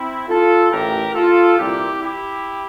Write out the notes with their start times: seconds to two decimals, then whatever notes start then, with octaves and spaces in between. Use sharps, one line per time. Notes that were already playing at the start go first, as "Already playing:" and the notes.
Already playing: C4 E4
0.28 F4 A4
0.72 A1 A2 E3 G4 A#4
1.15 F4 A4
1.58 C2 A#2 E4 G4
2.02 E4 G4